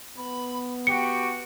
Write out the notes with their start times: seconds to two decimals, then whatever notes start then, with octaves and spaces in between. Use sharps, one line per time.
0.17 B3 B5
0.87 F#4 G4 G5 C#7